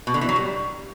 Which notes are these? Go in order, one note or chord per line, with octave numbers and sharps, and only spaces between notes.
B2
D3
E3
F#3
G3